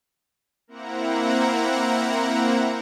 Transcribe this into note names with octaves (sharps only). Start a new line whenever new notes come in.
A#3 C4 E4 F#5 A#5